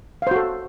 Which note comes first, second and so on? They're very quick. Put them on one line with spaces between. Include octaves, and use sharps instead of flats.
F5 C5 F#4 A4